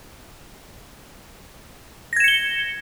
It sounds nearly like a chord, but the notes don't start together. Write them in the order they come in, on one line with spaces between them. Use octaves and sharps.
A#6 G#6 E7 C#7 G7